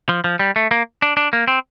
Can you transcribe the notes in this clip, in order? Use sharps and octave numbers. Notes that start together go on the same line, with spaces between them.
F3
F3
G3
A3
A#3
D4
D4
A#3
C4